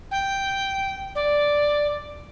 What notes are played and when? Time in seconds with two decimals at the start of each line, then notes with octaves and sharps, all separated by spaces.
0.11 G5
1.15 D5